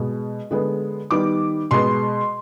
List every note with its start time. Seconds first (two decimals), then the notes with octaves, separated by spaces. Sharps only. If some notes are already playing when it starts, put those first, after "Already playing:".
Already playing: B2 G#3 B3
0.51 D3 G#3 B3
1.11 D#3 G3 B3 D6
1.71 B2 G#3 B3 C6